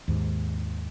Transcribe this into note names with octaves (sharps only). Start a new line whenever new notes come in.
D#2 G#2